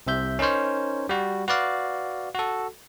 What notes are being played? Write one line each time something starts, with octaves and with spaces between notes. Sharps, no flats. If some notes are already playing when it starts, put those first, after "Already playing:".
C2 C3 E5 G6
C#4 D#4 A#4 C5 C#5
G3 F#4
F#4 B4 D5 F5
F#4 A4